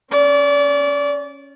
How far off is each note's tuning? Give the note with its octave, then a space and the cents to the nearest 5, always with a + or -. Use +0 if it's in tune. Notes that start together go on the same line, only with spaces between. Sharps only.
C#4 +0 D5 -30